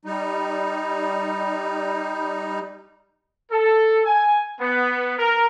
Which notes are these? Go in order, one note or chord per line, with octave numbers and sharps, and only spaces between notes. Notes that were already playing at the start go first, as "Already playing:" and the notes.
G3 D#4
A4
G#5
B3
A#4